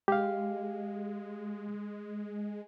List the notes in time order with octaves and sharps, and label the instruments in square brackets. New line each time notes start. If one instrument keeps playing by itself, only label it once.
[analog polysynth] G#3 [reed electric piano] G4 F5